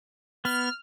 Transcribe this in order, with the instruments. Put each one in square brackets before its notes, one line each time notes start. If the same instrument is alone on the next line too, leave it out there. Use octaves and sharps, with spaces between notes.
[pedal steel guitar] B3 [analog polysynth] F6